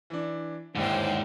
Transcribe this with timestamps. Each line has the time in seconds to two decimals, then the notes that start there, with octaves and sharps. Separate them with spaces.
0.10 E3 D4
0.76 G1 D#2 G#2 E4 C5 C#5 G5